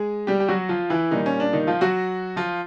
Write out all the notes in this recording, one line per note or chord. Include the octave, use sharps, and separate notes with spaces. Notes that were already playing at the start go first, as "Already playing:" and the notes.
Already playing: G#3 G#4
G3 G4
G4
F#3 F#4
F3 F4
E3 E4
A#2 D#3 G3 A#3 D#4
C#4
D4
D#3 D#4
F3 F4
F#3 F#4
F3 F4